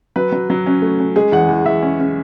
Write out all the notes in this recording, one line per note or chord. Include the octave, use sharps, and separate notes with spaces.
F#3 B4
F#3
F#3
C#4
A3
C#4
G#3 G#4
E2 F#5
E2
E2 E5
C#4
C#4